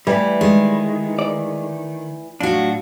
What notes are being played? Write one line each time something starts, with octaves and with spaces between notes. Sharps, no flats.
E3 G3 A3 G4
D#3 G#3
D5
A2 F#3 D4 F4 F#4